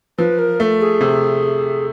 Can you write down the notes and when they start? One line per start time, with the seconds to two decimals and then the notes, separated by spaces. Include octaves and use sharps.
0.18 F3 B4
0.39 A#4
0.60 A3
0.80 G#4
1.01 C3